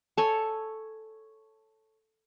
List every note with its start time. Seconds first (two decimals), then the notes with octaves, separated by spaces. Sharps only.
0.17 A4 C#5 G#5